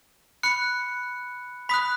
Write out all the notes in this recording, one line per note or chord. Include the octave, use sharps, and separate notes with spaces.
B5 F#6 C#7
B5 D#6 F#6 B6